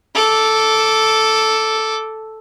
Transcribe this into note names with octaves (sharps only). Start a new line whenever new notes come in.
A4 D6